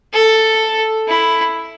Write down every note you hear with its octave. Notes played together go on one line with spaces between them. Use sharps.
A4
E4